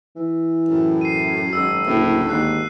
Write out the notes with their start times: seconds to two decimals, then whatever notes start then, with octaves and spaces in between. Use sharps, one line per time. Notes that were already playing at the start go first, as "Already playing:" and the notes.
0.16 E3
0.69 F#2 A2
1.01 C7 D#7
1.53 G#1 E6
1.87 F#1 D2 A2
2.29 G#1 D#2 F#6 C7